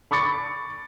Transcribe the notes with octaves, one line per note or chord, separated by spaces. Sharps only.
B5 C#6 D6 A6 C#7